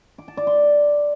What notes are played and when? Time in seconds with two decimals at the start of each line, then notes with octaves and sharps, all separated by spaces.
0.18 D6
0.28 A5
0.37 D5
0.47 C6